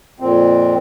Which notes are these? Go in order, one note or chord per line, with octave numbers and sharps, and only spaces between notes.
F2 A#2 C4